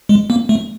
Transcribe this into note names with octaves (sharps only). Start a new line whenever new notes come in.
G#3
A#3
A3